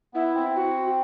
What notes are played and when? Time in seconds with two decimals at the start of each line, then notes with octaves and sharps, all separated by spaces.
0.14 B3 E4
0.35 C4
0.56 F#4